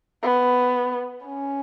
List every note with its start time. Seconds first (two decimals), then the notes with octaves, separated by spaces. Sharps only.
0.23 B3
1.25 C#4